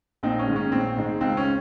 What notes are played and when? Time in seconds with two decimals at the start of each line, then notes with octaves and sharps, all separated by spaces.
0.23 A#1 C4 D#4
0.39 C#4
0.47 G#2 D#3 G#3
0.56 C#4
0.72 A#1 C4
0.96 G#2 D#3 G#3
1.20 C#2 C4
1.37 C#4